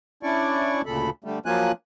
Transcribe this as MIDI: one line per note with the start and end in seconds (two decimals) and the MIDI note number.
0.23 0.82 61
0.23 0.82 62
0.23 0.82 64
0.23 0.82 74
0.23 0.82 85
0.86 1.10 38
0.86 1.10 46
0.86 1.10 49
0.86 1.10 69
0.86 1.10 83
1.24 1.39 50
1.24 1.39 55
1.24 1.39 57
1.46 1.72 53
1.46 1.72 54
1.46 1.72 58
1.46 1.72 65
1.46 1.72 80
1.46 1.72 90